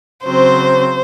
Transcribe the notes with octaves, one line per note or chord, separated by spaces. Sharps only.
C#3 F#3 C4 C5